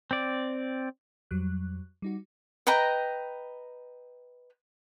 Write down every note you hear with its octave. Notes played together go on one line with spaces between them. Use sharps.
C4 D5
F2 F#3 G3 F#6
G3 D#4 F#4
B4 D#5 G5 A#5